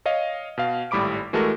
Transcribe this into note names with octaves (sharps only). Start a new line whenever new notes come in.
C#5 D#5 F5
B2 F5
G#1 A2 G3 B5 D6 D7
E3 G#3 A3 F#4 A4 A#4